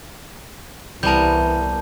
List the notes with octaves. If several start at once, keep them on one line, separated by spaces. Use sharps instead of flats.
C2 E3 G3 B3 A#4 A5 G6